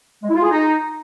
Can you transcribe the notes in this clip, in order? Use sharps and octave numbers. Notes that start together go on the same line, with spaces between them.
G#3
E4
F4
G#4
D#4